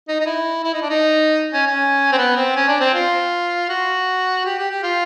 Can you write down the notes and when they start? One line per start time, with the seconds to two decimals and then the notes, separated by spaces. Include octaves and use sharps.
0.08 D#4
0.21 D#4
0.26 E4
0.64 E4
0.73 D#4
0.82 D4
0.90 D#4
1.54 C#4
1.67 C#4
2.12 C4
2.18 B3
2.36 C4
2.56 C#4
2.68 D4
2.81 C4
2.94 F4
3.70 F#4
4.46 G4
4.59 G4
4.71 G4
4.83 F4